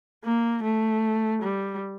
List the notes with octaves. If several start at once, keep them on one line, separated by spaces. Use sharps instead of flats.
A#3
A3
G3